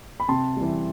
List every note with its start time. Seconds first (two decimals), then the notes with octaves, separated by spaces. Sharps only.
0.20 B5
0.29 C3 A5 C6
0.56 E3 G3